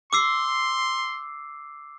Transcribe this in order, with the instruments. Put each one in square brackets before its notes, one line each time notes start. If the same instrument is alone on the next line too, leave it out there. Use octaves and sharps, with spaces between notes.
[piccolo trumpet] C6 [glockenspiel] D6 E6 C7